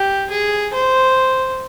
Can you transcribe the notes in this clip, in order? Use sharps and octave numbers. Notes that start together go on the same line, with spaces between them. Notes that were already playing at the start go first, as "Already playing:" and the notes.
Already playing: G4
G#4
C5